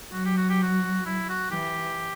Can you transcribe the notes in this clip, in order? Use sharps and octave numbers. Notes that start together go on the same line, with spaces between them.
F#3 F#4
G4
F#4
G4
F#4
E4
F#4
E3 G4